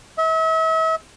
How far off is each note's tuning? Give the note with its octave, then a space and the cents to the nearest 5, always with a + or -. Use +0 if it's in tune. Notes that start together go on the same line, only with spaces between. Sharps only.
E5 -40